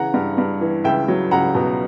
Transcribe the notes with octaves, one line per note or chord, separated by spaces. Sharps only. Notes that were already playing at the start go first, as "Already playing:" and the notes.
Already playing: C#3 E3 F#5 A#5
G2
G2
E3
C#2 E5 G5
F#3
C#2 F#5 A#5
B2